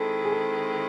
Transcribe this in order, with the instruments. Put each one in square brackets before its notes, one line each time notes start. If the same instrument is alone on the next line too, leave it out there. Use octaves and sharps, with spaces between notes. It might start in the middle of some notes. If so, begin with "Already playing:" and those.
Already playing: [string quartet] D#3 G#3 C4 E4 [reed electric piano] A4
[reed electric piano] G#4
A4